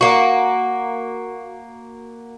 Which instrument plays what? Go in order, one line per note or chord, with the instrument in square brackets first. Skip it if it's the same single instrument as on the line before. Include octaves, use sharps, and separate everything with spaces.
[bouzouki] A#3 F#4